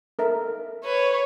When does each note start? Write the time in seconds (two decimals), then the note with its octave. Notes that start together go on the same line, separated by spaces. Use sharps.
0.19 A4 A#4 E5
0.85 B4 C#5